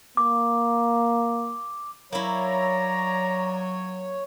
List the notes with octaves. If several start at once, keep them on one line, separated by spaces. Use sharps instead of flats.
A#3 D6
F#3 A#3 E4 C#5 D5 A#5